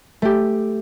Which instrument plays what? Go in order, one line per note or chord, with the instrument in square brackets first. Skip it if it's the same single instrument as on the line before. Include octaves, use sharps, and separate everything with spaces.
[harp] A3 G4